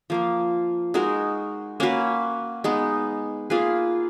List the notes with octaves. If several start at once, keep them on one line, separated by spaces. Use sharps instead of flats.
F3 A#3 F4
G#3 D#4 F#4 A#4
A#3 C#4 F#4 B4
G#3 B3 D#4
A#3 F4 G#4 B4